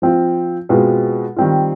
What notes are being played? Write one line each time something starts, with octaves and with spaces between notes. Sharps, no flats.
F3 C4 F4
B2 G#3 C4 F4 B4
D#3 G3 C4 F4